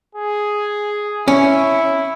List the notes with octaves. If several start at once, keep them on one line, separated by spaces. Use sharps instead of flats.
G#4
C#4 E4